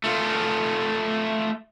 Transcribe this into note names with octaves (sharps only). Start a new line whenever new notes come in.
A3 F4